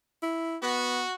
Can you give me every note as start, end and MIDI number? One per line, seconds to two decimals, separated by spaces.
0.23 0.57 64
0.62 1.03 59
0.62 1.14 66